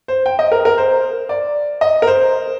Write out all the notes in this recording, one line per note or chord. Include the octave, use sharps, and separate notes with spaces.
C5
G5
D#5
A#4
A#4
C5
D5
D#5
A#4
C5